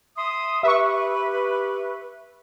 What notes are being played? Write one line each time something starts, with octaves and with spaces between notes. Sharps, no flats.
E5 C6 D#6
G4 B4 E5 C#6